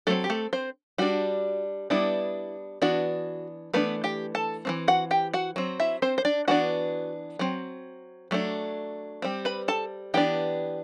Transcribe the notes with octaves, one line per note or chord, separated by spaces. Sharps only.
F#3 A3 C4 A4
G4
A3 A4
C4 C5
G3 D4 F#4
G3 B3 D4 E4
E3 B3 D4 F#4
E3 A3 B3 D4 B4
G4 G5
A4 A5
E3 A3 C4
F#4 F#5
G4 G5
F#4 F#5
F#3 C4
E4 E5
C4 C5
C5
D4 D5
E3 B3 D4 F#4 F#5
F#3 C4
F#3 A3 D4
G3 C4
B4 B5
A4 A5
E3 B3 D4 G4 G5